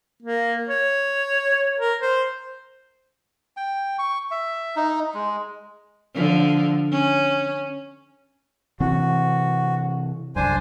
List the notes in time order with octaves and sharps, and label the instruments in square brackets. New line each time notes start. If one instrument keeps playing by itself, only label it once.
[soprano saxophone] A#3
C#5
A#4
C5
[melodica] G5
C#6
E5
D#4
G#3
[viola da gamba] D3 F3
C#4
[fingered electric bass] C3 E3 C4 [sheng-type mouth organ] F#4
[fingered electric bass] C2 F#2 [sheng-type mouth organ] D4 C5 G#5